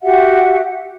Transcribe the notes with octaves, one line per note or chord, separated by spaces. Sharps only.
F#4 G4 E5 F#5